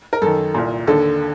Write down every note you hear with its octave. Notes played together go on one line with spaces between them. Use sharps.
A#4
F#2 D#3 A4
C2 A#2
D#2 D3 A4